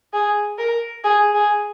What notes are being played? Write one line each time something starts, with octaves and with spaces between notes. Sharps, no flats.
G#4
A#4
G#4
G#4